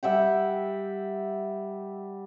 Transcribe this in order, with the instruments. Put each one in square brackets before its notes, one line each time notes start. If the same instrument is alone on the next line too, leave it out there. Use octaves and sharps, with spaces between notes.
[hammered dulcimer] G3 E5 F#5 G5